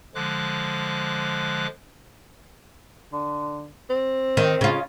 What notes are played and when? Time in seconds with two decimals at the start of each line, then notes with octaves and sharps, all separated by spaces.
0.15 D3 F3 G#3 D6 F#6
3.13 D3
3.90 C4
4.37 D#3
4.61 C#3 F4